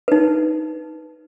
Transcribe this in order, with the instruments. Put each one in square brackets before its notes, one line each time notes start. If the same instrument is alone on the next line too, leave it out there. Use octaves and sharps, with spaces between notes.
[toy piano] D#4 B4